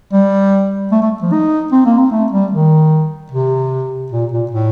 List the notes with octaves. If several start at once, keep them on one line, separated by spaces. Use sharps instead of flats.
G3
A3
A3
F3
D#4
C4
A#3
C4
A3
G3
D#3
C3
A#2
A#2
A2